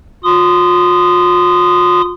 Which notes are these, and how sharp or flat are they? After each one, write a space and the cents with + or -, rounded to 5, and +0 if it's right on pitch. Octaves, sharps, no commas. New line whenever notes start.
F4 +40 C6 -25 D#6 -15